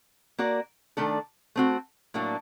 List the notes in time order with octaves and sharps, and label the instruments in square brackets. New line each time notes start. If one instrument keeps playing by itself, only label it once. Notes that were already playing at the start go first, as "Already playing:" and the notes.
[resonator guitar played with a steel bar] A#3 F#4 A#4 D5
D#3 A3 D4 A4
A3 C4 F#4
A2 F#3 A#3 D4